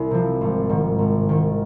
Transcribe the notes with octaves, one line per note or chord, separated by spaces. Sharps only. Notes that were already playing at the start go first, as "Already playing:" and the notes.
Already playing: C2
C3 F3
G#1
G#2 D#3
G#1
G#2 D#3